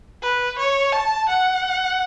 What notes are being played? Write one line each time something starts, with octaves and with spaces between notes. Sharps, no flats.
B4
C#5
A5
F#5